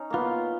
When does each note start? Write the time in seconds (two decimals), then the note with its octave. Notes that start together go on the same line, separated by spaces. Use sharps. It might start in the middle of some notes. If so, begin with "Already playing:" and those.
Already playing: C#4 D#4
0.10 A#3 B3 F4